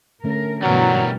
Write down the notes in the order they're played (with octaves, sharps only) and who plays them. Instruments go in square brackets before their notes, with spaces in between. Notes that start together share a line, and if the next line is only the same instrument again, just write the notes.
[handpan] D3 A3 C#4 [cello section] A#4
[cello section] G2 B2 E3 [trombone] F#3 [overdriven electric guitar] G3 A#4